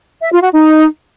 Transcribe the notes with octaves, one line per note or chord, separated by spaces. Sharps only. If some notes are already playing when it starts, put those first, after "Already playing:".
E5
F4
F#4
D#4